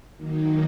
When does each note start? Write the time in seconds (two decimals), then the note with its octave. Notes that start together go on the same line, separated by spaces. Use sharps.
0.17 D#3 F#3 A#3 D#4